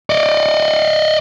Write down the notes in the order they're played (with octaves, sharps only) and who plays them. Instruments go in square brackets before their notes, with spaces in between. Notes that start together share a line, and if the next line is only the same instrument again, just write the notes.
[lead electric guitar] D5 D#5